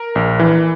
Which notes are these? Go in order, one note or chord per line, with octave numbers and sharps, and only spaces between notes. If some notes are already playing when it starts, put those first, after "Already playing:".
Already playing: A#4
A#1
E3